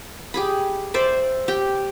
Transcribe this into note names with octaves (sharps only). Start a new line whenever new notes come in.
G4 G#4 B5
C5 D5 E5
G4 G5